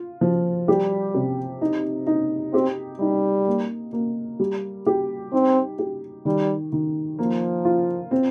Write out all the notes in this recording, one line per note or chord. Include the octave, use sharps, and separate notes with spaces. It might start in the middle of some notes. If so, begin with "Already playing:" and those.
Already playing: F4
F3
G3 G4
C3
D#4
D#4
C4 G4
G3 D#4
A#3
A#3
G3
G4
C4 D#4
G4
D#3 G3
D#3
F3 A#3
F4
C4